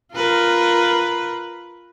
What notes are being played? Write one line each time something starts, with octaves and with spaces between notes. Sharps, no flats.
F4 A#4 B4